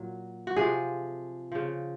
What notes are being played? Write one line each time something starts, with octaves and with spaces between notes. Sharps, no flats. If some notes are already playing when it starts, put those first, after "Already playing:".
Already playing: A#2 F#3
F#4
C3 F3 G#4
C#3 F3